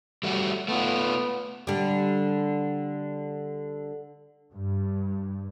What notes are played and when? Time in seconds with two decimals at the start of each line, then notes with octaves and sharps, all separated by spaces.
0.23 G3 A3 F#4
0.68 A3 B3 F4
1.67 D3 G3
4.54 G2